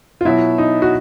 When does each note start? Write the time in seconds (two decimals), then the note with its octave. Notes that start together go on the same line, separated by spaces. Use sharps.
0.21 F4
0.25 B2 F#3 E4
0.58 D#4
0.82 F#4